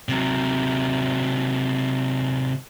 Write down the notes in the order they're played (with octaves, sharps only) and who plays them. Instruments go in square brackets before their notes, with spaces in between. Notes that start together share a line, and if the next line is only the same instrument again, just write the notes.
[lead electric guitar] C3 F#3